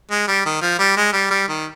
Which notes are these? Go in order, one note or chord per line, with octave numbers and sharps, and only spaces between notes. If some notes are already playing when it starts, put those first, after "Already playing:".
G#3
G3
D#3
F3
G3
G#3
G3
G3
D#3